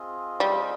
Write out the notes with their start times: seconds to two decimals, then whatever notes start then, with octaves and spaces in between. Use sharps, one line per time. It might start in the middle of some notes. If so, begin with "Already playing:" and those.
Already playing: C4 F4 G#4 D#5
0.40 G3